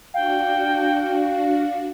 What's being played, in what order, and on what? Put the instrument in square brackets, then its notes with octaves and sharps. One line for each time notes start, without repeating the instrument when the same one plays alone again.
[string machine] D4 F#4 [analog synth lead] F5 [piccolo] G5